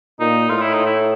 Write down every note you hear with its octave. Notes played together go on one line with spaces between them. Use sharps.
A#2 D#4
A2 F4
E4
D#4
E4